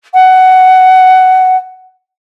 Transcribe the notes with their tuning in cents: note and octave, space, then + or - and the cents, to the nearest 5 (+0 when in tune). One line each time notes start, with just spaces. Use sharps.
F#5 +10